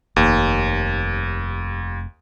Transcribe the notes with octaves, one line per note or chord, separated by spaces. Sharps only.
F1 D#2